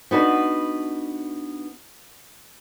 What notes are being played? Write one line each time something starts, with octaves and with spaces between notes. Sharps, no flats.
B3 D4 D#4 F#4 B4